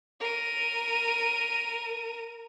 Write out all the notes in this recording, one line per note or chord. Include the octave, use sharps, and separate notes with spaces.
A#4 D#7